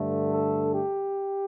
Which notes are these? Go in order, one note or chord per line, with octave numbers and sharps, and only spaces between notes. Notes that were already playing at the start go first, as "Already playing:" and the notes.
Already playing: G2 D3 A3
A4
G4